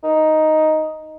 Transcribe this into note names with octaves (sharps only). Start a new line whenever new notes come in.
D#4